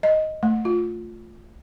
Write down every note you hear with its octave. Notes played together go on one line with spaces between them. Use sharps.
D#5
A3
F4